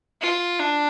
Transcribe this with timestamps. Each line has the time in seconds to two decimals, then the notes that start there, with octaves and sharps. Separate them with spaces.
0.21 F4
0.59 D4